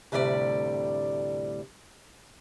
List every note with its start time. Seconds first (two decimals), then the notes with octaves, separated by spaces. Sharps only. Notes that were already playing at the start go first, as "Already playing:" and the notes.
0.12 D2 A2 C3 G3 D5